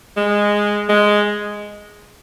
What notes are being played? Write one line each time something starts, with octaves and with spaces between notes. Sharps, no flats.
G#3
G#3